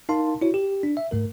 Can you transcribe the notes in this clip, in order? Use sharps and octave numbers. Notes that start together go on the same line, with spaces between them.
D#4 A#4 F5 A5 C6
E4 F#4 C#5
G4
D4
E5
G#2 A3 A#4